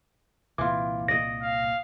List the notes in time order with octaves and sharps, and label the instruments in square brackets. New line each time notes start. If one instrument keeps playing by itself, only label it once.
[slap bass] C2 A#2 C4 [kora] E3 F4 [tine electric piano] D6
[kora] D5 D#5 [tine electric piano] A#6
[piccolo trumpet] F5